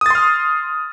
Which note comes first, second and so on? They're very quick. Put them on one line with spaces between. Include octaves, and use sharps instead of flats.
D#6 A6 C6 F6